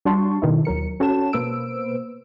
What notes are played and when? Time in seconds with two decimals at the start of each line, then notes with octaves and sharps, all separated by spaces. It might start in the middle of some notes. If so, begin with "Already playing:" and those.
0.05 G3 D4 F#4 A5 C6 C#6
0.42 B2 D#3 F#3 E4
0.65 D#2 F#3 A#4 C#7
1.00 C#4 F#4 A4 C#5 A5 E7
1.33 B2 A#3 B4 C5 E6 D7